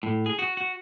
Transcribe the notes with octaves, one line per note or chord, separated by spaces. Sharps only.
A2
G#4
F#4
F#4